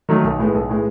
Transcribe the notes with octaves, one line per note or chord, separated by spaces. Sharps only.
D#3 F#3 A3
B1
A2 G#3 B3
B1
A2 G#3 B3